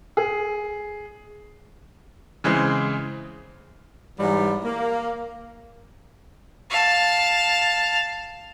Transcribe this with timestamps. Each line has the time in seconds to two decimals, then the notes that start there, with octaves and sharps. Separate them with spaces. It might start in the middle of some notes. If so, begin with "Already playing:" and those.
0.17 G#4
2.44 C#3 E3 G#3 C4 G#4
4.19 G#2 E3 F#3 G3
4.65 A#3
6.70 F5 A5